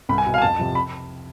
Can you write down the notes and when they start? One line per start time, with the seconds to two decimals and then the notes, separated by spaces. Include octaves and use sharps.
0.09 C2 B5
0.18 G#5
0.26 B2
0.34 F5
0.38 G#5
0.42 F2 A5
0.59 C3 F3
0.75 B5